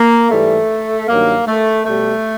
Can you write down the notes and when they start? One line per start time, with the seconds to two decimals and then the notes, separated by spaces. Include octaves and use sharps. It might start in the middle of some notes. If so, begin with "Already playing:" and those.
Already playing: A#3
0.30 G#2 E3 G3 A3
1.08 G2 D#3 F#3 A#3
1.47 A3
1.86 B2 G3 A3